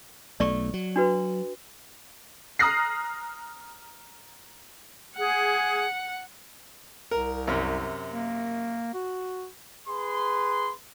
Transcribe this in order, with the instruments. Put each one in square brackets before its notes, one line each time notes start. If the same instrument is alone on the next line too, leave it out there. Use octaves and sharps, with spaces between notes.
[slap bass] B1 A3 [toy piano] D5 C#6
[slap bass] F#3
[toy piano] D4 F#4 B4
[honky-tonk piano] A#5 D#6 F6 F#6 A#6 C7
[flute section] G#4 [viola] F#5
[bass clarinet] C2 [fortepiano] A#4
[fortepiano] F#2 C3 F6
[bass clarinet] A#3
F#4
[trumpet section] G#4 B4 C6